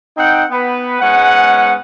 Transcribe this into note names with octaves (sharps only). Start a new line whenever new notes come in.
C4 D#4 F#5 G5
B3 B4
G#2 G#3 B3 C#4 F#5